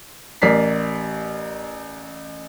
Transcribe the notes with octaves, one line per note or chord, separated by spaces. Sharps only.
A1 A#4 D5 B6 C7